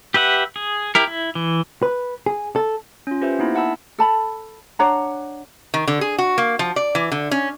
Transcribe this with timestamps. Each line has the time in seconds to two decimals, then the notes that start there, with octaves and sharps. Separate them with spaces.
0.14 G4 B4 E5 F#5
0.56 G#4
0.95 E4 G4 A#4
1.07 E4
1.35 E3
1.83 B4
2.26 G#4
2.56 A4
3.07 C#4 F4
3.21 F4 G4 B4 C5 E5
3.39 A#3 B3 D#4 E4
3.55 E5 F#5 A5 B5 E6
3.98 A4 A5 B5
4.79 D4 C#5 F#5 A#5
5.74 D#3
5.88 D3
6.01 G#4
6.18 F#4
6.38 A#3
6.59 F3
6.76 D5
6.95 E3
7.12 D3
7.31 C#4